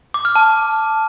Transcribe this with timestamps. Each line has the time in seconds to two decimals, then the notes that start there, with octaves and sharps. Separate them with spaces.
0.14 D6
0.25 F6
0.36 A5